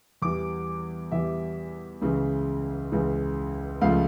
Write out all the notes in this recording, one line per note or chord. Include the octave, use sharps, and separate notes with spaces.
E2 E3 G3 D6
E2 E3 G3 E5
C#2 C#3 E3
C#2 C#3 E3
C#2 C#3 F3 A3 F5